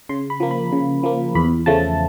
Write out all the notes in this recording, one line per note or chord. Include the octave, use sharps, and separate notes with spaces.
C#3 C6
B5
F3 A#3
B5
C#3
F3 A#3
E2 B5
C#3 F3 A3 A5